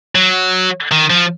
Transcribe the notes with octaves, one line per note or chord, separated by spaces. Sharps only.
F#3
D#3
F3